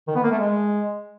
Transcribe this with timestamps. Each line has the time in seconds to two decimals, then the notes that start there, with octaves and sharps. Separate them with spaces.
0.08 D#3
0.15 B3
0.23 A#3
0.31 A3
0.39 G#3